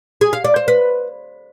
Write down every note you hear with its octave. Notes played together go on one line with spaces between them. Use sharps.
G#4
F5
D5
C5
B4